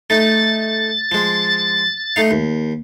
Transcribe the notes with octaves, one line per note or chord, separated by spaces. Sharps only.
A3 D#4 A6
F3 G#3
A3 D#4 F5
D#2